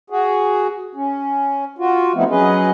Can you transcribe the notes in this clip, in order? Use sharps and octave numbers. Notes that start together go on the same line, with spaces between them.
F#4 G#4
C#4
F4 F#4
F3 A3 B3 C4 D#4 E4
F#3 C#4 G#4 B4 D#5